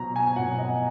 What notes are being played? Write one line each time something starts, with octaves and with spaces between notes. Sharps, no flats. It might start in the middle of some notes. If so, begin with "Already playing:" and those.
Already playing: B2 F#3 A#5
G#5
B2 F#3 F#5
D#5